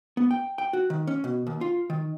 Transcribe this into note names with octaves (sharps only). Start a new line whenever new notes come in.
B3
G5
G5
F#4
D#3
C#4
B2
D#2
F4
D#3